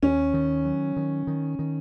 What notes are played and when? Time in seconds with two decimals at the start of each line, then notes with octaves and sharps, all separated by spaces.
0.02 D#2 C#4
0.34 D#3
0.65 F#3
0.96 D#3
1.27 D#3
1.59 D#3